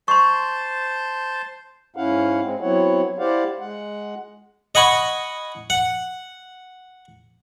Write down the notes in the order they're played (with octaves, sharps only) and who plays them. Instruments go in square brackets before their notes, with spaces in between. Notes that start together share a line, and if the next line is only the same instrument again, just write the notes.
[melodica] C5 A5 [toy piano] C6 C#6
[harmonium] G#2 C#4 E4 F5 F#5
G#3 C4
F#3 B3 C4 E4 C#5 F#5
E4 G4 C5 D5 F5 F#5
G#3 F#5
[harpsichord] D#5 F#5 G#5 B5 C#6
F#5